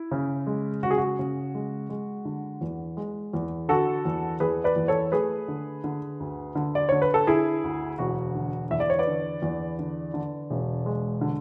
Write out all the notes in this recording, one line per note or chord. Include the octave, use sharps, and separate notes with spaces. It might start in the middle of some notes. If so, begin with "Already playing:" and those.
Already playing: E4
C#3
G#3
C#3 F#4
G#4
F#4
C#3
G#3
G#3
D3
E2
G#3
E2
D3 F#4 A4
E2
E2 G#4 B4
B4 D5
E2
A4 C#5
A3 G#4 B4
D3
D3
D2
D3
D5
D3 C#5
B4
A4
D3 E4 G#4
D2
E1 F#4
D3
E2 E5
D5
C#5
B4 D5
D3
E2
D3
D3
E1
G#3
D3